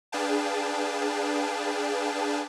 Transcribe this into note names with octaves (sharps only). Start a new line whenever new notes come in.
D4 G#4 B4 F5 G5 A5